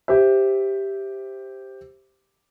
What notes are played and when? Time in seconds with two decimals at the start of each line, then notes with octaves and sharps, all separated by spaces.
0.08 G4 C5 E5